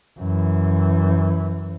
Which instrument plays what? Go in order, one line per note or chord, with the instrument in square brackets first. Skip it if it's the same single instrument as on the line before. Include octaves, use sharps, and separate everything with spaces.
[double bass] F#2 E3